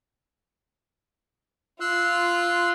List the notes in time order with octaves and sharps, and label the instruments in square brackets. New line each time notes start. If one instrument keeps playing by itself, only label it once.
[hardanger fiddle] F4 [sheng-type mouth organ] C6 E6 F#6